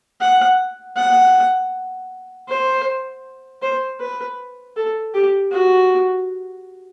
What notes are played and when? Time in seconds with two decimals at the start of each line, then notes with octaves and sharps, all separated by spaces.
0.21 F#5
0.96 F#5
2.48 C5
3.62 C5
4.00 B4
4.76 A4
5.14 G4
5.52 F#4